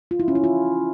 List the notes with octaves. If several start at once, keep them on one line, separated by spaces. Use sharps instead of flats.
F4
E4
C#4
E4
F4